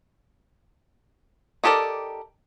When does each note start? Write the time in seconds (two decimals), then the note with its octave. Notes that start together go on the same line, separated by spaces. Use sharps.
1.64 D#4 G4 A4 A#4 D5